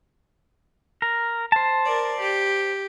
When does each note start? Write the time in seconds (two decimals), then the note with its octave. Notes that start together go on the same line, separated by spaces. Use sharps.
1.02 A#4
1.52 C5 A5
1.85 A#4 D5
2.21 G4